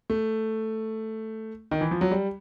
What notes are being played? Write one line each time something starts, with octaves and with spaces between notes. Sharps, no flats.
A3
D#3
E3
F3
F#3
G3